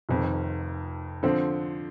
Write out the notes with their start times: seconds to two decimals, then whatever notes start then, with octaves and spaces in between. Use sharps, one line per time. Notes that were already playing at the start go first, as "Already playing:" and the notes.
0.09 F1 F2 D#3
1.23 D3 F3 C4